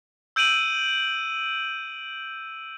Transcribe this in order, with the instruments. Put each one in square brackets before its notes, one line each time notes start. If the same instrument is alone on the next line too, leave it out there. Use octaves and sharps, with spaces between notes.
[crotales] E6 G6 D7 D#7 F#7